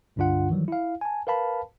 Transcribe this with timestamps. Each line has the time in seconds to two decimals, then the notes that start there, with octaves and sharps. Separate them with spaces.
0.16 C#2 G2 D3 D4 F4 F#5
0.50 D#3 E3 F#3 G3
0.68 E4 F5
1.01 G#5 A5
1.27 A#4 B4 F5 A5 B5